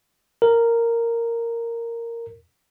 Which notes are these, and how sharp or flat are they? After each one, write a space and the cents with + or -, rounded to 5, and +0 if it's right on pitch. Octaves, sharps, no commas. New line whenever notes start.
A#4 -10